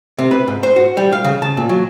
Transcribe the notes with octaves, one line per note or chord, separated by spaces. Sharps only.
C3
B4
G#2
C5
F#4
G3
F5
C#3
A5
A#2
F#3